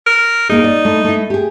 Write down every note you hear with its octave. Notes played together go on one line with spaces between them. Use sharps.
A#4
A#3 D#4 G#4
D5
A3 E4
A3 E4
G4 G#4